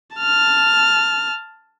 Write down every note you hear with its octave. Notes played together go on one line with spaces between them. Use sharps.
A5 F6